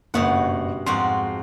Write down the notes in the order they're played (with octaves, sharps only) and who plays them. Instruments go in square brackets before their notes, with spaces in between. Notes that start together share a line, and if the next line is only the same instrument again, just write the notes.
[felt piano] F#1 [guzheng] G2 B2 F#5
[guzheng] F2 G#2 F#4 [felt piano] C6